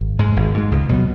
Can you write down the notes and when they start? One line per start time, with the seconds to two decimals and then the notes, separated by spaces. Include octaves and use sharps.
0.01 G#1
0.19 G#2 G#3
0.36 G#1
0.54 G#2 G#3
0.72 C#2
0.89 B2 F#3 B3